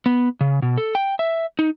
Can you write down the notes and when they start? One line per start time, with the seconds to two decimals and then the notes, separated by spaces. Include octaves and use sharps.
0.06 B3
0.41 C#3
0.62 B2
0.78 A4
0.95 G5
1.19 E5
1.59 D#4